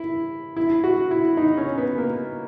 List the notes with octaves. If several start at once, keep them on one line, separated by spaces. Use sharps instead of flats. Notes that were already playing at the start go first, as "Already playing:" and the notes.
Already playing: E4
E4
F#4
E4
D#4
C#4
B3
A#3